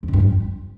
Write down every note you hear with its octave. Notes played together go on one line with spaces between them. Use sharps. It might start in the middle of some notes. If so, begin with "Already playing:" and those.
F2
D3
G2
F2